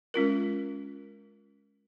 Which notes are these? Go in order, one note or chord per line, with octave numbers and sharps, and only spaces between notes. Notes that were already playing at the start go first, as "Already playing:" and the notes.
G#3 C#4 F4 A#4